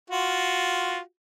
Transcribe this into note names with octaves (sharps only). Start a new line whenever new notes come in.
F4 F#4